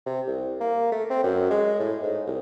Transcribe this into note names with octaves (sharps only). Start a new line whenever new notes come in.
C3
C2
A#3
A3
C4
F#2
G#3
A2
G#2
C2